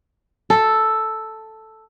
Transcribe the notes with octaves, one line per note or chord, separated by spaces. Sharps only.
A4